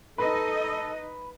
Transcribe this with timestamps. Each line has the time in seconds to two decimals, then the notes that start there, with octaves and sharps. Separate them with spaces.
0.18 D#4 A4 B4 D#5